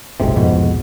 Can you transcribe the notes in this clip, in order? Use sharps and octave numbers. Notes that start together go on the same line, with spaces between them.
F#1 B1 G#2 C3
C2 F2 G#2 B2